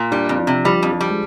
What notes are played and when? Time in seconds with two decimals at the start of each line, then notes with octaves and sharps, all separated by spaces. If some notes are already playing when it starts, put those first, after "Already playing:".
Already playing: A#2
0.11 G3 D4
0.29 F2
0.39 F3
0.47 C3
0.65 F3 G3
0.83 F2
0.91 F3
1.00 G3
1.10 G#3